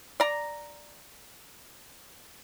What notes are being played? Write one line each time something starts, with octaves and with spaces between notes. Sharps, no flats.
D5 A#5